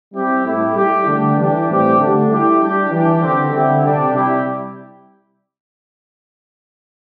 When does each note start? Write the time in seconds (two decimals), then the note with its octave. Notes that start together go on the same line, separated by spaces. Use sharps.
0.13 G3 C4 E4 G4
0.44 A2 A3 E4 G4
0.75 G3 E4 G4
1.05 D3 A3 D4 G4
1.36 E3 G3 D4 G4
1.68 A2 E3 G3 C4 G4
1.98 D3 A3 D4 G4
2.28 G3 E4 G4
2.59 G3 D4 G4
2.90 E3 G3 D4 G4
3.21 D3 G3 C4 G4
3.51 D3 C4 E4 G4
3.82 C3 G3 D4 G4
4.13 C3 G3 E4 G4